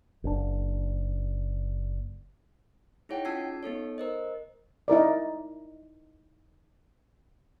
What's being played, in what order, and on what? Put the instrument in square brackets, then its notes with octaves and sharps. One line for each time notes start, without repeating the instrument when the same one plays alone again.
[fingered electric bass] F#1 D4
[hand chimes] D#4 E4 G#4 C#5 F#5 G5
C#4 F4 A5 E6 G#6 C7
B3 D#4 A4 C#5
A#4 C5 D#5
[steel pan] D#4 E4 A#4 D5